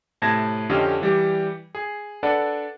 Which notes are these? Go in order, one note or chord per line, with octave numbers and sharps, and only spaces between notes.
A2 C3 A5 G#6 A#6
F2 D3 C#4 G4 D#5 F5
E3 G3 G4
G#4
D4 A4 B4 D5 F#5